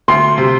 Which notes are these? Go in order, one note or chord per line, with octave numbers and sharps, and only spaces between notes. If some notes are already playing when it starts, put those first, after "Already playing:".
D2 C6
C3